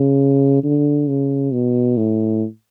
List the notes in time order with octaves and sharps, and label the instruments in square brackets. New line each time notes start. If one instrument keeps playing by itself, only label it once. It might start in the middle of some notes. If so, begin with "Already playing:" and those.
Already playing: [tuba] C#3
D3
C#3
B2
A2